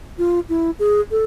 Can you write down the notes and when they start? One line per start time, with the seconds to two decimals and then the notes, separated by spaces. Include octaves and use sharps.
0.18 F4
0.49 E4
0.79 G#4
1.11 A4